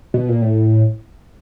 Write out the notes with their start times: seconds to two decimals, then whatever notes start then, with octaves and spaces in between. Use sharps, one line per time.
0.14 B2
0.28 A#2
0.42 A2